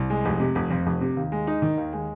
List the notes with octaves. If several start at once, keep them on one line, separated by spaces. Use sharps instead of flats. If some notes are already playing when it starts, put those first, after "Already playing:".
Already playing: C2
G#3
F1
C3
F1
F2
F1
C3
D#2
G#3
D#4
D#3
D#2
G#3